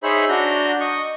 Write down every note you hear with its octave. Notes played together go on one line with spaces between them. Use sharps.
D#4 G#4 C5 C#5 E5 B5
D4 F#4 A#5 G6
D#5 C#6